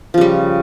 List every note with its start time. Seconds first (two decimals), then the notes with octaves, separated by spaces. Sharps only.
0.14 F3
0.18 C#3
0.21 G3